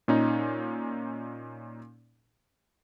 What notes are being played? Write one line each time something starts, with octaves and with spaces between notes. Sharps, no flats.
A#2 C#4 D#4